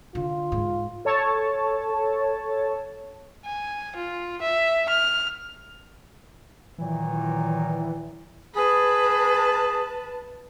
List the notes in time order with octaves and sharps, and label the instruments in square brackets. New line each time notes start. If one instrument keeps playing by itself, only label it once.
[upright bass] D3 [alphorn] F4
[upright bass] G#2
[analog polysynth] A4 C#5 A5
[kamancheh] G#5
F4
E5
F6
[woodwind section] A#2 D#3 F#3 [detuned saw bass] E3
[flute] G#4 [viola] B4 A5